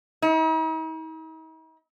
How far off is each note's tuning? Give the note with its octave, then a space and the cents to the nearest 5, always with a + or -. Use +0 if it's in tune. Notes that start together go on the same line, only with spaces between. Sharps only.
D#4 +45